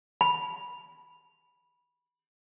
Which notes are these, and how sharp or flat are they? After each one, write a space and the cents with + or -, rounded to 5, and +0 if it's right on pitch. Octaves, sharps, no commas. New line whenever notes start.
B5 -10